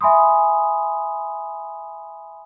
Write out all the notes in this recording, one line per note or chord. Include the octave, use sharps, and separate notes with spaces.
E5 G#5 B5 C6 D#6